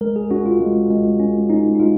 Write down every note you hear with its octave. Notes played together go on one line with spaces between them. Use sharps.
G#3 A#4
G#4
C#4 F#4
F4
G#3
G#3
C#4
C#4 D#4
D#4
G#3 F4